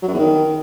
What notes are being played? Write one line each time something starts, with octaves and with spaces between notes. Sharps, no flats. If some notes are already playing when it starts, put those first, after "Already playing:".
F#3
F#2
E2
D#3